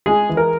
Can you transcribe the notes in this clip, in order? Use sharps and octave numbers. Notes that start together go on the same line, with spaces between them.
G#3 G#4
E3
A#4